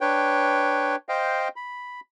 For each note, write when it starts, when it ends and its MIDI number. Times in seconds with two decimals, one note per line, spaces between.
0.01 0.96 62
0.01 0.96 71
0.01 0.96 73
0.01 0.96 79
1.09 1.48 72
1.09 1.48 75
1.09 1.48 77
1.09 1.48 79
1.56 2.00 83